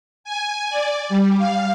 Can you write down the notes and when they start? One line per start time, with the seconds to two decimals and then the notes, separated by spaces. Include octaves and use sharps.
0.24 G#5
0.70 D5
1.09 G3
1.38 F5